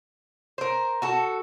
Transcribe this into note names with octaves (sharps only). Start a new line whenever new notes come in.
A#4 C5
F#4 A4